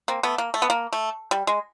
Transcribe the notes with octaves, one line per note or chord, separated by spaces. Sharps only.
A#3 C4
A3 B3
A#3
A3
B3
A#3
A3
G3
G#3